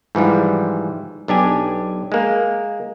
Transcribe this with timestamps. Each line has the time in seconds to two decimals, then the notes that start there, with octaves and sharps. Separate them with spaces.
0.15 G#2 E3 F3 G3
1.28 B1 D4 G4 G#5
2.12 G#3 A#3